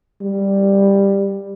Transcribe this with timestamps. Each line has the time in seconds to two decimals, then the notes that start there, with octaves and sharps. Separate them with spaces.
0.21 G3